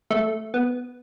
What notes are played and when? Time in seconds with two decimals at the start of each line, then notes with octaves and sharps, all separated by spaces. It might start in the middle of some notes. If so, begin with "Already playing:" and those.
0.11 A3
0.54 B3